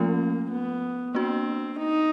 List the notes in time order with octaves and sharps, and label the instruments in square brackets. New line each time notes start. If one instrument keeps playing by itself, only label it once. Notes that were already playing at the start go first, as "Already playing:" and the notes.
Already playing: [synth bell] F3 A3 C#4 F4 [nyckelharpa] A#3
[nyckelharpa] B3
[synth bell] A#3 D4 F#4 [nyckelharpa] C4
[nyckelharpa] D#4